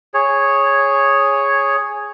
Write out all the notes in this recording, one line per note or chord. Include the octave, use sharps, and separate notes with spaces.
G#4 C#5